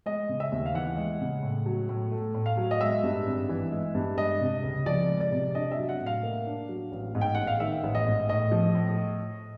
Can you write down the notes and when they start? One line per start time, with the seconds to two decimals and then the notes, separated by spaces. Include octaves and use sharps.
0.06 G#3 D#5
0.29 C#3
0.40 E5
0.52 D#2
0.66 F5
0.74 E3 F#5
0.97 G#3
1.21 C#3
1.43 A2
1.66 F#3
1.89 A2
2.12 A3
2.34 A2
2.46 F5
2.57 F#3
2.71 D#5
2.81 G#3 E5
3.03 G2
3.26 G#1
3.49 E3
3.72 G#3
3.95 G2
4.18 G#3 D#5
4.40 C3
4.64 C#2
4.86 F3 D5
5.09 G#3
5.21 D5
5.32 C3
5.55 D4 D#5
5.71 E5
5.77 F#3
5.89 F#5
6.00 A2
6.06 F5
6.23 A#3
6.47 D4
6.69 F#3
6.92 A1
7.15 G#2
7.21 G5
7.35 A1 F#5
7.47 F5
7.60 D#3 E5
7.83 A1
7.95 D#5
8.06 G#2
8.29 A2 D#5
8.52 F3
8.75 A2